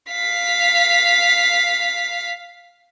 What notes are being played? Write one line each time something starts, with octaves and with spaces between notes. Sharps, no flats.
F5 B6